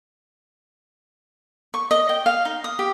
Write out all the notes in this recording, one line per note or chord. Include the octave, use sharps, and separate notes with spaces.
C#6
D#5
G5
F5
D#4
D#6
G4